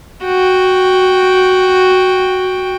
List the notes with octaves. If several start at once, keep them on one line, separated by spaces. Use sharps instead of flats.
F#4 G5